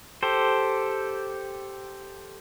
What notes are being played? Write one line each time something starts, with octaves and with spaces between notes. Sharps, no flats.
G4 A4 C5